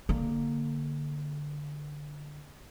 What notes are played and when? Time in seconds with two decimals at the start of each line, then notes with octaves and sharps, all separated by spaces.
0.09 D3 A#3